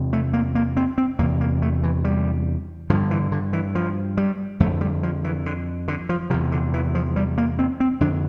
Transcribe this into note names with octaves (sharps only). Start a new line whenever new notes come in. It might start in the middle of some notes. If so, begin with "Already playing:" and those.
Already playing: E2 C3
A3
A#3
A#3
C4
C4
E2 C3 A#3
A#3
A3
E3
G3
G2 D3 F3
E3
D3
E3
F3
G3
F2 D3 A3
G3
F3
E3
D3
D3
F3
E2 C3 F3
D3
E3
F3
G3
A#3
C4
C4
F2 D3 D4